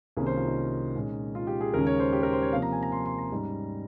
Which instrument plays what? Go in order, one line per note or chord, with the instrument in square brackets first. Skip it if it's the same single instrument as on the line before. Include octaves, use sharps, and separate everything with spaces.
[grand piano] C2 C3 D#3 A#3 C#4 G#4
C5
F4
D#4
A#2 G#3 C#4
F4
G4
G#4
D#2 C#3 G#3 C#4 A#4
C#5
C5
G4
A#4
C5
C#5
C3 F3 A#3 F5
A#5
G#5
A#5
C6
C6
A#5
G#2 G3 C#4